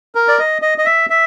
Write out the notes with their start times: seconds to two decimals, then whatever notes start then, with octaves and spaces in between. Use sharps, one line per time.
0.15 A#4
0.28 D5
0.39 D#5
0.62 D#5
0.78 D#5
0.85 E5
1.10 E5